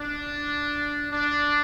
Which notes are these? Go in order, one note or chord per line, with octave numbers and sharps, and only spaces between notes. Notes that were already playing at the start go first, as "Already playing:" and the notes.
Already playing: D4
D4